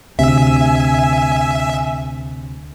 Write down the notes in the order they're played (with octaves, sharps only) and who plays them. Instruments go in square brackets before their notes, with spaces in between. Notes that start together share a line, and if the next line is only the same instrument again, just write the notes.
[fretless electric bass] D2 [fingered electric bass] C3 [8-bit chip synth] E5 [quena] G#5